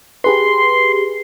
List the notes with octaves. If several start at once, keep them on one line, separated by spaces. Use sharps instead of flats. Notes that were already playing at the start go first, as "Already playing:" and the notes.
G4 G#4 B4 C6